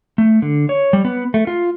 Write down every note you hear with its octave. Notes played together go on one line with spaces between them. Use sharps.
A3
D3
C#5
G3
B3
A3
F4